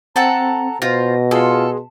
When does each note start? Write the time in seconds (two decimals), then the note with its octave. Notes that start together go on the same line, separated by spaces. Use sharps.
0.16 C4 A4 F#5 A5 A#5
0.82 B2 F4 C5 A#6
1.31 F4 G#4 A4 C6